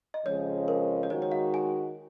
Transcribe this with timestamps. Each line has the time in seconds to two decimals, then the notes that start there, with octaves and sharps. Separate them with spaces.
0.14 D#5
0.26 F2 C#3 F3 G#3 C#4 C#5
0.68 A#4
1.03 C#5
1.10 D#3 G#3 D#4 F#4 C5
1.22 C#5
1.32 F5
1.54 G#5